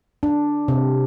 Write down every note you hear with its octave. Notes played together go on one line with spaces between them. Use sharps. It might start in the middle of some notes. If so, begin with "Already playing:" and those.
D4
C3